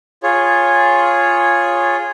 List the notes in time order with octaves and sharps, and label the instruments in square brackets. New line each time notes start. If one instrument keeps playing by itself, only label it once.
[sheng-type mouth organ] F4 G#4 C#5